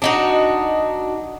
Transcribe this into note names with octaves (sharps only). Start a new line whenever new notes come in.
D4 D#4 F#4